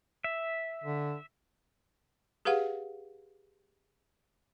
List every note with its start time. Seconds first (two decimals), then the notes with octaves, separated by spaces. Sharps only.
0.24 E5
0.84 D3
2.45 G4 G#4 B4 F5 F#5